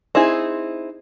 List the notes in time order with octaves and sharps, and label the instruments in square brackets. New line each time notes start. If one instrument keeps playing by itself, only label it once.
[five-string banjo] C4 D#4 E4 G#4